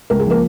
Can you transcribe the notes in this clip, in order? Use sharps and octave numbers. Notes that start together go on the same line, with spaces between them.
C#2 A#4
G#4
F3 A#3 A#4